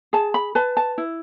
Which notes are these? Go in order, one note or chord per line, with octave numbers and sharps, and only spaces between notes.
G#4 A5
B5
B4 A5
A5
E4